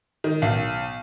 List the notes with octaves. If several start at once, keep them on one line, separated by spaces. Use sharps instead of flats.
D#3
B1